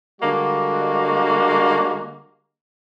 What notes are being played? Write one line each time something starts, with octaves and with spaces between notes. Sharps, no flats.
D3 G3 G#3 A#3 F#4